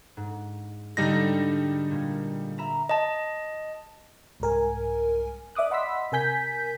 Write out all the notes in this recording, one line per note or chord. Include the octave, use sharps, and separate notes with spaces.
G#2
G#2 D3 G3 D#4 A#6
A#2
E5 A#5 B5
D#5 A5
C2 G#2 A#4 G#5
D5 E5 D6 D#6 F#6
D#5 F#5 B5 C6 E6 B6
C3 A#4 G#5 G6 B6